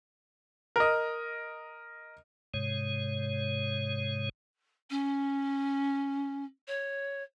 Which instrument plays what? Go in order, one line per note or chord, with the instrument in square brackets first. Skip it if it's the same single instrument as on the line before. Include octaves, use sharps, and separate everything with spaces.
[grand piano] A#4 D#5
[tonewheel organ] G#2 C3 G#3 C#5
[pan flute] C#4
C#5